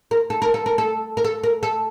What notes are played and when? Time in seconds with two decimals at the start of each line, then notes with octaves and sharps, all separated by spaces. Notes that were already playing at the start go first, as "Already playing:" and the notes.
0.11 A#4
0.30 A4
0.42 A#4
0.54 A4
0.66 A#4
0.78 A4
1.17 A#4
1.24 A4
1.44 A#4
1.63 A4